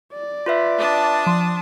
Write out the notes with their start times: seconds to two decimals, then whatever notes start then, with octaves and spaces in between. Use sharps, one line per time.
0.13 D5
0.46 F4 B4 E5
0.78 D4 A5 D#6
1.26 F3 C6